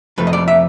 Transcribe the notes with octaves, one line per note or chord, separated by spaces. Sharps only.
F2 C3 F3 A3 B4
D#5
D5
E5